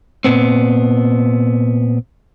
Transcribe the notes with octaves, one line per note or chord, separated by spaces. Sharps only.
A#2 B3 C4